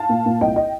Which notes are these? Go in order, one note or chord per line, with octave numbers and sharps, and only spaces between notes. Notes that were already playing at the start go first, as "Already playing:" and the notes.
Already playing: F5 A5
A#2
A#2
C2 D#5 G5
D#5 G5